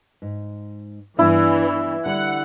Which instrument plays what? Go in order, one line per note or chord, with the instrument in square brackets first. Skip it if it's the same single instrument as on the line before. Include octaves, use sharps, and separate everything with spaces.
[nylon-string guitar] G#2
[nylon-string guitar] G2 B3 D4 [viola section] E3 [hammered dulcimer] E4
[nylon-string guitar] D3 G3 [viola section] F#5